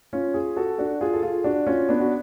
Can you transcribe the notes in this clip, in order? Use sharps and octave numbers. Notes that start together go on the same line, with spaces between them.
C#4 F4
F4 G#4
F#4 A4
D4 F#4
F4 G#4
A4
F4 G#4
D4 F#4
C#4 F4
B3 D4
F#4